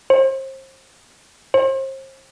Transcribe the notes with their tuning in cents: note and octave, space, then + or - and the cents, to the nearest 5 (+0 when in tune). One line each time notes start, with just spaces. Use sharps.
C5 +30
C5 +35